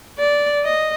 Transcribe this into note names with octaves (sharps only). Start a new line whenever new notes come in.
D5
D#5